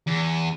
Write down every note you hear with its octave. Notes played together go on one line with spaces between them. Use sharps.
E2